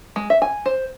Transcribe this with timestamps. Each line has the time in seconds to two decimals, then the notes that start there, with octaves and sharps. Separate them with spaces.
0.16 G#3
0.30 E5
0.42 G#5
0.66 C5